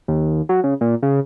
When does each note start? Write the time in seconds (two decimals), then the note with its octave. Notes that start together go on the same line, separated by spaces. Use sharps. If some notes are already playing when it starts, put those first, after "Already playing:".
0.08 D#2
0.49 F#3
0.64 C#3
0.81 A#2
1.02 C#3